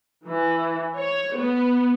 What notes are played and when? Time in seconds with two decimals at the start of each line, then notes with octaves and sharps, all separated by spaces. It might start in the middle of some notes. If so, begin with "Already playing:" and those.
0.23 E3
0.97 C#5
1.36 B3